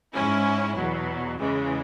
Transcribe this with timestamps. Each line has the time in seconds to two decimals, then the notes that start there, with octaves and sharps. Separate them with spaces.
0.14 G#2 G#3 C#4 E4
0.76 E2 B2 F#3
1.39 E2 C#3 E3 G#3